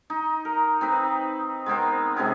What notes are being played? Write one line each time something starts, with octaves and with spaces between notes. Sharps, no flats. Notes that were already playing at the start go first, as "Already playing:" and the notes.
D#4
A#4
C4 D#4 B4
G#3 B3 C4 A#4
C3 G#3 B3 C#4